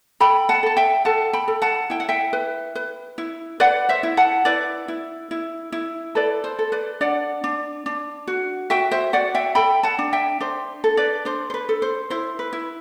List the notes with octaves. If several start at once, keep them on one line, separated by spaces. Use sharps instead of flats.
A4 G5 B5
F#5 A5
A4 A5
E5 G5
A4 F#5 A5
G5 B5
A4
F#5 A5
E4 G5
F#5
E5 G5
B4
B4
E4
B4 D5 F#5
C5 E5
E4
F#5 A5
E4 B4 D5
E4
E4
E4
A4 B4 D5
C5
A4
B4 D5
D4 D5 F#5
D4
D4
F#4
F#4 E5 G5
C5 E5
F#4 D5 F#5
E5 G5
A4 G5 B5
F#5 A5
D4
E5 G5
D4 C5
A4
B4 D5
D4 C5
C5
B4
A4
C5
E4 C5
B4
E4